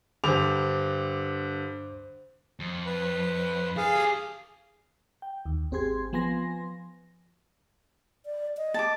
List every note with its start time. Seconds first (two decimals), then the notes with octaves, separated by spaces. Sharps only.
0.24 G2 D3 C5 D6 F7
2.60 F2
2.86 B4
3.77 G#4 A4 F5
3.96 G4 A4
5.22 G5
5.46 D#2
5.71 G#1 C4 G4 G#4 C6 G#6
6.13 F3 B3 G#5 C6 A#6
8.26 D5
8.57 D#5
8.74 A5 D6